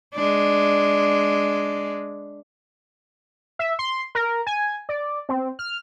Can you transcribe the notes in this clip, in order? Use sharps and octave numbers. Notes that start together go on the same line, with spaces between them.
G#3 D4
E5
C6
A#4
G#5
D5
C4
F6